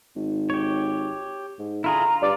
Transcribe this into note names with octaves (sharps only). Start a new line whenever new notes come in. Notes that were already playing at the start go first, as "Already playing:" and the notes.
G#1
G4 C#5
G#2
D3 E4 F4 G#4 A#5
F4
G2 D5